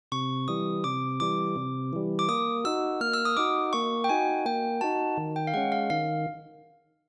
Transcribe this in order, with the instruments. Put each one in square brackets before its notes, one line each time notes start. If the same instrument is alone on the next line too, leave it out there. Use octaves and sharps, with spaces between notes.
[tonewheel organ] C3 [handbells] C#6
[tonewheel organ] E3 G3 [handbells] D#6
[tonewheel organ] C3 [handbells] D6
[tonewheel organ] E3 G3 [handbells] D6
[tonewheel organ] C3
E3 G3
[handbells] D6
[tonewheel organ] A#3 [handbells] D#6
[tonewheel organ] D#4 F#4 [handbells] E6
[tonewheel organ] A#3 [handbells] F6
[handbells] E6
D#6
[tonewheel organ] D#4 F#4 [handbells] D6
[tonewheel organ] A#3 [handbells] C#6
[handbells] G5
[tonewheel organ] D#4 F#4 [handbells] G#5
[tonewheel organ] A#3 [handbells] G5
[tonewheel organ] D#4 F#4 [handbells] A5
[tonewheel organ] D#3
[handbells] G5
F5
[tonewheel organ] G#3 C#4 [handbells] F#5
[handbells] F5
[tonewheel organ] D#3 [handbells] F5